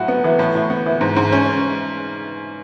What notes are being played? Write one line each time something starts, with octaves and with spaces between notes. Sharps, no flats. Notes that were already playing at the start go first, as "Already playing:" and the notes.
Already playing: A2 F#3 F#4
B3
E3
A2
A2
B3
E3
G#2
G#2
C#4